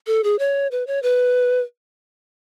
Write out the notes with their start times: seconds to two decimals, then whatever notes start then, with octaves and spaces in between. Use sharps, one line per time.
0.07 A4
0.24 G#4
0.39 C#5
0.71 B4
0.87 C#5
1.03 B4